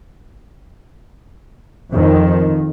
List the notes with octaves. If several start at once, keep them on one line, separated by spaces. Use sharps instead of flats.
F2 D#3